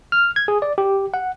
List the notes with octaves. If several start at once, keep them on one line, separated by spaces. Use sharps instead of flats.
F6
G#6
G#4
D5
G4
F#5